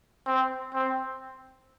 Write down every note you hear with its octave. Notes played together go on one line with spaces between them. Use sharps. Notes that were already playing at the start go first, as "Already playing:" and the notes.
C4
C4